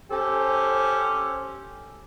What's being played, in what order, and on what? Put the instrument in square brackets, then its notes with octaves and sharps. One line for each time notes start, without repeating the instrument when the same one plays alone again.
[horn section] C#4 G4 A4 C5